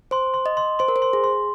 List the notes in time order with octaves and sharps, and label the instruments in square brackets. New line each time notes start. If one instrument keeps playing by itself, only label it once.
[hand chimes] C5 [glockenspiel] C6
[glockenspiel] C6
[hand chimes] D#5
[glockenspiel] C6
[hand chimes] C5 [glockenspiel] C6
[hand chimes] A#4
C5
[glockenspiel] C6
[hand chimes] G#4
[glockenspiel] C6